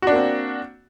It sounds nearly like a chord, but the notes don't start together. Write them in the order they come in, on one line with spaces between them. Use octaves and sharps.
F#4 D4 A#3 C4